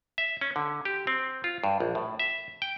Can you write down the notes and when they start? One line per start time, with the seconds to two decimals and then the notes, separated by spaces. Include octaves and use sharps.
0.18 E5
0.41 C#4
0.56 D3
0.85 G4
1.07 C4
1.44 F4
1.64 G2
1.80 A#1
1.95 A2
2.19 E5
2.62 G5